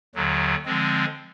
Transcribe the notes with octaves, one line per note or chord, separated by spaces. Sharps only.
D#2 D3 F#3
D3 F3 G#3 C4